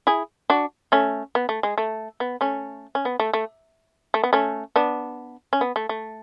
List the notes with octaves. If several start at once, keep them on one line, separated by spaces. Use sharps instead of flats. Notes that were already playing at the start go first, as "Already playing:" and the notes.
E4 G#4
D4 F#4
A3 C#4
B3
A3
G#3
A3
B3
A3 C#4
C#4
B3
A3
A3
A3
B3
A3 C#4
B3 D4
C#4
B3
A3
A3